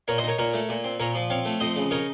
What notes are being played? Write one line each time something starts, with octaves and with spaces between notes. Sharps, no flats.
A#2 A#4 C#5
C5 D#5
D#4 A#4 C#5
A#2 A#4 C#5
A3
A#2
C4
A#2 A#4 C#5
F3
C4 C#5 F5
A3
F2 C5 D#5
C#3
D#4 A#4 C#5